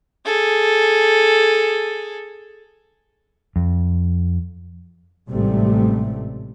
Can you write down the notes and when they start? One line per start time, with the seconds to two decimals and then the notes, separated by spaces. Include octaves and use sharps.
0.25 G#4 A4
3.56 F2
5.30 A1 G#2 C3 G3 A3